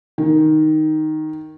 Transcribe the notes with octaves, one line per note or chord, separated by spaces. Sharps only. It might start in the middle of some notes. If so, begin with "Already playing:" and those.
D#3